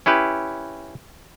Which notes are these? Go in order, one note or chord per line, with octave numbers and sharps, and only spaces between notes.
C#4 E4 G4 B4